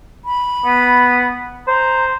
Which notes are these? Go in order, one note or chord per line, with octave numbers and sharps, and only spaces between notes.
B5
B3
C5 A#5